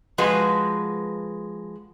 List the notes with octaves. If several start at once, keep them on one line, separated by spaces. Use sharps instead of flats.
F3 G#3 F#4 B4